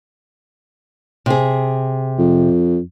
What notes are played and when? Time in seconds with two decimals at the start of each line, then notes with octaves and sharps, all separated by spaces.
1.26 C3 G#4
2.18 F2